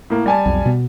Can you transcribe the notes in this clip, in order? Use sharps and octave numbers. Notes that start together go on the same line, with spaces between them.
A2 A#3
G3 G#5 A5
B1 F2
B2 B3